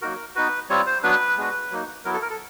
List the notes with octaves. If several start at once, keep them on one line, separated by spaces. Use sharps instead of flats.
F#3 A#3 D#4 F#4 A#4
B3 D#4 F#4 B4
G3 C4 F4 C#5
C5
F#3 B3 D4 B4
G#3 B3 D4 F#4
F#3 A#3 D#4
F#3 B3 E4 A#4
A4
A#4
A4